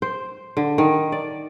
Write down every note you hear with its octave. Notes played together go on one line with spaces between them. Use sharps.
C5
D3
D#3
D5